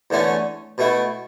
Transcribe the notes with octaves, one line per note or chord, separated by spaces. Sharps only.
E2 D3 A3 C#4
B2 A3 E4